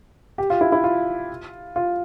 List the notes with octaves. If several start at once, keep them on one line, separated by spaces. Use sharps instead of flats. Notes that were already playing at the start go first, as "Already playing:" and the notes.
G4
F4
E4
E4
F4
F4